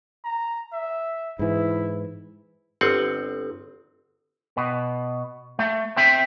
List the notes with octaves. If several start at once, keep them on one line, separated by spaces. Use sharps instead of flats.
A#5
E5
G#2 E3 E4
G1 C4 F#5
B2
A3
C4 E5 G5